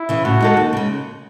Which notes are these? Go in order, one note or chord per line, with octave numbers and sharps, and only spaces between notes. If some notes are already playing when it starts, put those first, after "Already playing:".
Already playing: E4
C#3 E3
A2 F#4
G#3 D#4 A4
D#2
C#3 G#3